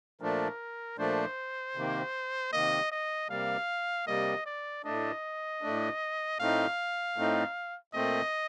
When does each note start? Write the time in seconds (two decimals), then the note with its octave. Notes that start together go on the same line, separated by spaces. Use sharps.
0.21 A#2 F3 A3 D4 A#4
0.98 A#2 F3 A3 D4 C5
1.75 C3 D#3 A#3
2.53 C3 D#3 A#3 D#5
2.92 D#5
3.30 C3 G3 A#3 F5
4.07 C3 G3 A#3 D#5
4.46 D5
4.85 A2 A3 D4 D#5
5.62 A2 A3 D4
6.40 A2 A3 C4 D#4 F5
7.17 A2 A3 C4 D#4
7.94 A#2 A3 C4 D#5